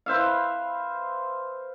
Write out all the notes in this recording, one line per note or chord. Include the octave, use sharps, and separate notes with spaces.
B4 C5 E5 F5